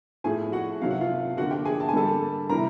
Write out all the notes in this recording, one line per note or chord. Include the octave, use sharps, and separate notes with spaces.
A2 F3 A3 G#4 G#5
F#4 F#5
C3 D#3 F#3 F5
F#5
F4 F5
D3 F3 A#3 F#4 F#5
G4 G5
G#4 G#5
A5
G#5
D3 G3 A#3 A4 A5
C3 E3 G3 A#4 A#5